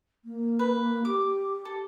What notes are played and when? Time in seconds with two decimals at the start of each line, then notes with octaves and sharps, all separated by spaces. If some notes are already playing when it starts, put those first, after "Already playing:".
0.24 A#3
0.59 B4
1.05 G4 D6
1.65 A4